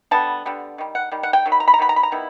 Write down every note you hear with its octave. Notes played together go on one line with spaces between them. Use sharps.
D3 G3 B3 A5
D3 G3 B3
D#3 G3
F#5
D#3 G3
F#5
G5
D#3 F#3
B5
A#5
B5
A#5
D#3 F#3 B3 B5
A#5
B5
A#5
D#3 G3 B3 E4